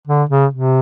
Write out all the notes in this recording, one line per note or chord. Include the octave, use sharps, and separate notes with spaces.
D3
C#3
C3